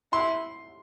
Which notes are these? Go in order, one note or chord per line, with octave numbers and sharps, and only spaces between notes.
E4 C6